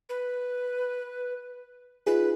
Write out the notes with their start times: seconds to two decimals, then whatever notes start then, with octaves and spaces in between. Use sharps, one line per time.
0.09 B4
2.07 D#4 F4 G#4 B4